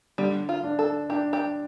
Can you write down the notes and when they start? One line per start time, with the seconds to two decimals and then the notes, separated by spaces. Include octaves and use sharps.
0.18 D3 G3
0.49 F4
0.64 D4
0.79 A4
1.10 D4 G4
1.33 G4